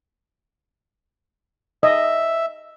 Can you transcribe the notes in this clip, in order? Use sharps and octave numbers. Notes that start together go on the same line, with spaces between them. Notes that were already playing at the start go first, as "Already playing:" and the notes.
D#5 E5